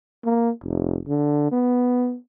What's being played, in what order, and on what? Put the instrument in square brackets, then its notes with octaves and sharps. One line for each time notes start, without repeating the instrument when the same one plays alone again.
[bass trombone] A#3
F1
D3
B3